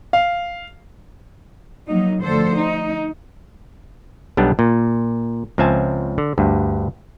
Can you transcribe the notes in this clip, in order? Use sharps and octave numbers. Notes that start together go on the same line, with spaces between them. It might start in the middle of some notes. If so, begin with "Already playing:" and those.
F5
F3 F#3 A#3 D#4
D2 D3 F3 A4 C5
D#4
B1 G3 B3 D4
A#2
C#2 F3 C4 E5 G#5 A5
D3
D2 G2